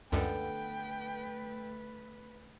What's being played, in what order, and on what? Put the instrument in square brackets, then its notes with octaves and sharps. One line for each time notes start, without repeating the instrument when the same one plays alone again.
[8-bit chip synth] C#2 F#2 [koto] D3 B3 A4 [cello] A3 B4 [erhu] G5